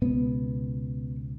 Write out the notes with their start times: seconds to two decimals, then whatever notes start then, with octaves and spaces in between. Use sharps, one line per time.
0.02 C#2 B2 B3